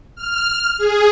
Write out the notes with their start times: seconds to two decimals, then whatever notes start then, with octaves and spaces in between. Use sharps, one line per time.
0.16 F6
0.78 G#4